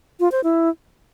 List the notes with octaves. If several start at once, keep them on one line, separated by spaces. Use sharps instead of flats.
F4
C5
E4